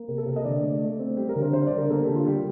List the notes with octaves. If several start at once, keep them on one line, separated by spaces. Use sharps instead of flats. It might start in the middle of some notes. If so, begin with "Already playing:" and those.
Already playing: A#3
C3 A#4
A4
C3 A#4
D#5
D3 D5
A3
A3
C4
G3 G4
A#4
D3
C5
G3 C5
D5
D3
A#4
A#3 A4
G4
D3
F4
G3 G4